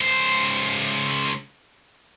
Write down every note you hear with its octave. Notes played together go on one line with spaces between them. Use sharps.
C#2 C5